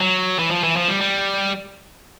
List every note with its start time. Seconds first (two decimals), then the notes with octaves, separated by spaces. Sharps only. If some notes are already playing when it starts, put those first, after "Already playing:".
0.01 F#3
0.39 E3
0.51 F3
0.64 E3
0.76 F3
0.88 G3
1.01 G3